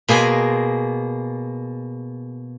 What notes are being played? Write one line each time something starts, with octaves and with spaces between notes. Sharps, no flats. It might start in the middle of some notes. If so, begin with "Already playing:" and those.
B2 A#3 G#4 G#5 C6